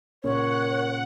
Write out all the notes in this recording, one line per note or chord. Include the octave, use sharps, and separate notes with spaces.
A#2 C#3 A#4 C#5 F#5